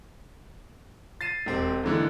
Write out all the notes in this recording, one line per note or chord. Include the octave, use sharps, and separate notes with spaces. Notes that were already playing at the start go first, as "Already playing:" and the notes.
A6 C7 D#7 E7
E1 C4 G4
D#2 G#2 D3 E3